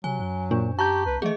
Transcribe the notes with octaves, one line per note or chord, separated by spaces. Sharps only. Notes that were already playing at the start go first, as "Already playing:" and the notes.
C3 F#3 G#5
F#2
A#2 D4
G4 A5 A#5 C#6 G6
C2 B4
E3 A3 G#4 D#5